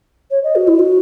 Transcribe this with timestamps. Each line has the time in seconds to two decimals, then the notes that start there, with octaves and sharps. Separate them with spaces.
0.31 C#5
0.44 D#5
0.55 F#4
0.68 E4
0.79 F#4